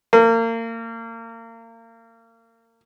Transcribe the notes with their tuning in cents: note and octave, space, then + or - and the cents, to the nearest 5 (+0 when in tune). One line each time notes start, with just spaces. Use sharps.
A#3 -35